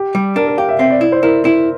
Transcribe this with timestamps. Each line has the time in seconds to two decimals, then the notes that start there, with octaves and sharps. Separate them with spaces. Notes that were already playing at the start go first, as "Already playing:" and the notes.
Already playing: G4
0.15 G3
0.36 D4 A#4
0.47 A#4
0.57 G4 F5
0.69 E5
0.79 C4 E5
0.90 D5
1.01 E4
1.12 C5
1.23 E4 A#4
1.45 E4